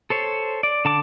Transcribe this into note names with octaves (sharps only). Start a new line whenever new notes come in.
A4 C5 C#5
D5
D3 A5 D6